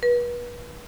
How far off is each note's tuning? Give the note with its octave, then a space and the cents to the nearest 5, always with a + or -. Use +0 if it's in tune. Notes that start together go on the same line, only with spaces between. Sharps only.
B4 -35